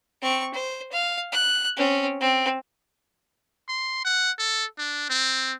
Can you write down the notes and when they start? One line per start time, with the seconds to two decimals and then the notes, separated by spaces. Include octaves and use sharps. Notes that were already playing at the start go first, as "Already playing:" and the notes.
0.22 C4 C#6
0.54 C5
0.92 F5
1.32 F#6
1.77 C4 C#4
2.21 C4
3.68 C6
4.04 F#5
4.39 A4
4.78 D4
5.09 C4